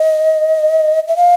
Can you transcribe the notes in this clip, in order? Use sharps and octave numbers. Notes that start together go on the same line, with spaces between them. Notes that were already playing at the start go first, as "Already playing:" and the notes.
Already playing: D#5
E5
F5